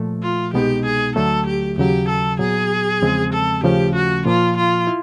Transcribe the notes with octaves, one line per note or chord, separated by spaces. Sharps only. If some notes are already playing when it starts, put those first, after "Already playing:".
Already playing: A#2 F3 A3
F4
C2 B2 G#3 B3 D#4 G4
G#4
D2 D3 F#3 A3 A4
G4
D#2 C#3 F#3 G4
A4
A#2 F#3 B3 G#4
E2 C#3 F3 G#3 C4
A4
D#2 C#3 F3 A3 C#4 G4
F#4
A#2 F3 A#3 F4
F4
E4